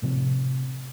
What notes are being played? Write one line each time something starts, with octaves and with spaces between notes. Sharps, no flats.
A2 C3 F3